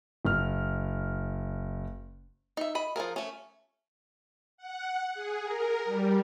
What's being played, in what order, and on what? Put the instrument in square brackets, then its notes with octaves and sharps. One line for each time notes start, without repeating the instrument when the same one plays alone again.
[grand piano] F#1 F6
[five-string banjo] D#4 E5
D#5 B5
F3 A3 G#4 A#4
A3 C#4
[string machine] F#5
G#4
A#4
G3